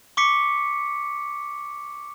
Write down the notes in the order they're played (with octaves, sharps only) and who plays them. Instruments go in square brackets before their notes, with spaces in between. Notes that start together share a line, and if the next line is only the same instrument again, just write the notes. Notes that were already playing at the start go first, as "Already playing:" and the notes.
[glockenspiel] C#6 D6 B6 C#7